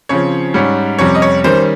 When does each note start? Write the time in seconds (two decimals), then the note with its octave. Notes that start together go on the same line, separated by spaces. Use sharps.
0.09 C#3 F3 C4 C#5
0.54 G#2 G3 C#4
0.99 F2 C3 G3 C#4 C#5
1.15 D#5
1.22 C#5
1.44 D#3 G3 C#4 C5